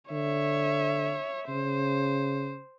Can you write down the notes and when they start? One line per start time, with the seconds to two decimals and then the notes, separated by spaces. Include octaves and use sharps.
0.11 D3 C#5 E5
1.48 C#3 C5